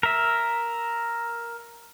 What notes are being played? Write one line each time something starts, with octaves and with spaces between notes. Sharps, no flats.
A#4 E5